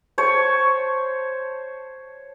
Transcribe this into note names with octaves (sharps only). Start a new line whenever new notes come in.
C5 C#5 A5